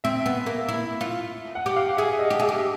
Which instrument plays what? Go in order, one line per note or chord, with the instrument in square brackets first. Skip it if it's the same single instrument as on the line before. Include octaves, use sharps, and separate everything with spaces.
[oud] C4 [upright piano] E5
[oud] B3
A#3
E4
F4
[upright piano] F#5
[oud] G4
[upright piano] F5
[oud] G#4 [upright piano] E5
[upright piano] D#5
[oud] G4
[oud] G#4 [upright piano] E5
[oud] G4